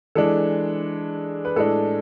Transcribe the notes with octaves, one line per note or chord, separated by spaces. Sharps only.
E3 G#3 D4 A4
B4
A2 G#3 D4 A4